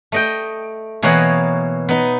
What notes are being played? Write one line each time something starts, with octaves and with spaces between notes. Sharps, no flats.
A3 D#5 G5
B2 E3 A#3 C#5 D#5 F#5
B3 D#4